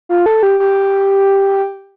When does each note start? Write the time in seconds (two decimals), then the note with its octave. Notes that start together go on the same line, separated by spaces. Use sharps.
0.09 F4
0.26 A4
0.43 G4
0.60 G4